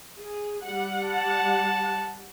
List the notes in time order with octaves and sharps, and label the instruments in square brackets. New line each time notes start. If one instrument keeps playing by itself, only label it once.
[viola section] G#4
G3 F#5
[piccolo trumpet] A5